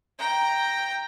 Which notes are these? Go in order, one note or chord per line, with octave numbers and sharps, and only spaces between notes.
G5 A#5